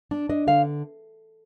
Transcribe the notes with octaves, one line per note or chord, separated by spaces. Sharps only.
D4
D4 D#5
D3 F5